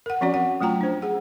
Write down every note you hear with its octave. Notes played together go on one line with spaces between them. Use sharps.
A#4 F#5
F3 C4 C#4 F#4 D5
F#5
F#3 A3 F4 G5 A#5
D4 C5
G#4 F#5